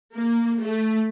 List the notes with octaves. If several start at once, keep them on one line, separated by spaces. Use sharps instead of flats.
A#3
A3